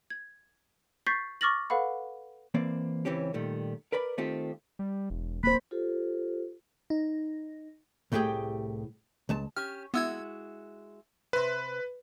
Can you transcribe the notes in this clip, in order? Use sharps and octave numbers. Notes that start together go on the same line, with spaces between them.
G#6
C#6 G6 A6 B6 C7
C#6 D6 F6 A6 A#6 F#7
A4 B4 F5 F#5 B5
E3 A#3 C4 D5
C#2 E3 C4 C#4 G4
A#2 D#3 G3 A3
A#4 B4 D5 B5
D#3 A3 C4 F4 G4
G3
E1
D1 A#3 C5 B5
F4 G4 A4 C5
D#4
C2 A2 A3 G4 G#4 G5
C#2 G#3 A5
C#4 G4 F6
G#3 B3 E4 F#4 E6 G#6
C3 B4 C5